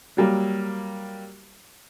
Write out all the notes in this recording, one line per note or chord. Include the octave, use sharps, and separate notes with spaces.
F#3 G3 A#3